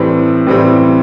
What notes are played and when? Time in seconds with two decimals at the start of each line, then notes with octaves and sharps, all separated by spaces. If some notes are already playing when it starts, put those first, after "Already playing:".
Already playing: A2 E3 G3 C4
0.47 A2 E3 G3 C4